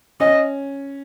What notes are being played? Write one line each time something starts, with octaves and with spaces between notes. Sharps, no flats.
C#4 D#5